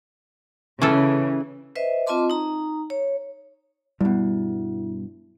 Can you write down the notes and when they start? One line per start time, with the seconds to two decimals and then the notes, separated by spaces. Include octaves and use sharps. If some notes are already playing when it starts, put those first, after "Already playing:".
0.82 C#3 E3 C#4 A4
1.75 B4 C5 D#5 E5
2.07 C4 F4 D#5 A5 C6 D6
2.30 D#4 A#5
2.90 C#5
4.01 G2 B2 G3 E4